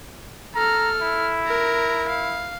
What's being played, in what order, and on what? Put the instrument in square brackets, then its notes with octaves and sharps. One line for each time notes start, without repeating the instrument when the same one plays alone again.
[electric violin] A4 F6 [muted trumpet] A#5
[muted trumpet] E4
[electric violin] A#4 A#5
F5